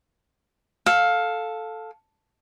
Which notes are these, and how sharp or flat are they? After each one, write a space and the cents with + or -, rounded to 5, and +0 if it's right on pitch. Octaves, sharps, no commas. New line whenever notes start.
A4 +0 F5 +15